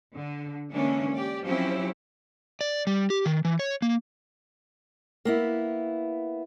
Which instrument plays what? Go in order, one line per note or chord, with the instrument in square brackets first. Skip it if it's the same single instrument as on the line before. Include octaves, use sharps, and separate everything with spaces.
[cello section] D3
D3 E3 G#3 A#3 C#4 D4
G4 D5
F3 F#3 C4 C#4 E4 G4
[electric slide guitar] D5
G3
G4
D#3
E3
C#5
A#3
[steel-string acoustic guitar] A#3 B3 E4